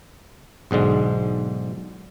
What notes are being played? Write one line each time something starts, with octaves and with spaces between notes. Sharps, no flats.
B1 G#2 D3 G#3